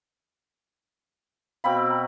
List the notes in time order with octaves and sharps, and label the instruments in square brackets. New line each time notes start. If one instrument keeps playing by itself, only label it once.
[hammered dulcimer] B2 C4 B5 [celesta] F5 G5
[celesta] E6
A#5